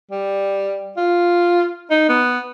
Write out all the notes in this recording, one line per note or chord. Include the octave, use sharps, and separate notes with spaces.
G3
F4
D#4
B3